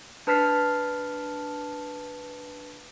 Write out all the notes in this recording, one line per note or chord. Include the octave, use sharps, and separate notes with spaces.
D4 B4 A5 F6 B6 C7